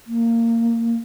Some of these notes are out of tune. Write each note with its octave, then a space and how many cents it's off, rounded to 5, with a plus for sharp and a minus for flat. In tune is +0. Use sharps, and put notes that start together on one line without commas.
A#3 -15